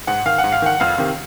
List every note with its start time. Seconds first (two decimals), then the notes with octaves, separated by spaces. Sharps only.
0.07 G#2 F#5
0.26 D#3 F5
0.38 F#5
0.44 G#2
0.52 F5
0.62 D#3 F#5
0.80 F2 F5
0.98 C3 D#3